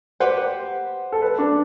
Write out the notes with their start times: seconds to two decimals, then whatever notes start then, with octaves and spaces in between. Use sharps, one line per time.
0.20 G4 B4 C5 F#5
1.12 A4
1.22 B4
1.39 D4